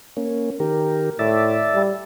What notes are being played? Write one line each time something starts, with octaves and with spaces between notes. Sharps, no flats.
A#3 C#4
D#3 G4 A#4
A2 D5 E5 A5
G3